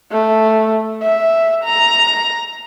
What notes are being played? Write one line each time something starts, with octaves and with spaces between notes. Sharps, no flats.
A3
E5
A#5